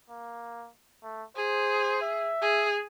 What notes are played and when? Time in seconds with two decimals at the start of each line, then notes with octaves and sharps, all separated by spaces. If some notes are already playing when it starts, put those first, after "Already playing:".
0.10 A#3
1.03 A3
1.36 G#4 C5
2.02 E5
2.42 G#4